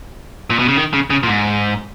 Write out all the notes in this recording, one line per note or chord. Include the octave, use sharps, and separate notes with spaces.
A#2
B2
C#3
D#3
C#3
C#3
A#2
G#2